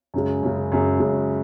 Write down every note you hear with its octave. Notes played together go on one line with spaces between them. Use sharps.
F#2 C#3 G#3
F#2 C#3 G#3
F#2 C#3 G#3
F#2 C#3 G#3